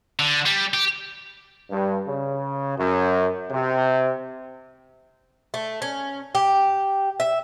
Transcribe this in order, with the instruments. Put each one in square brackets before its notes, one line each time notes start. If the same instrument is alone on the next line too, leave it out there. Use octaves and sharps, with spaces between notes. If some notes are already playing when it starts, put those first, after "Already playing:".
[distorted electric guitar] D3
G3
G4
[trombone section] G2
C#3
F#2
C3
[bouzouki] A3
C#4
G4
E5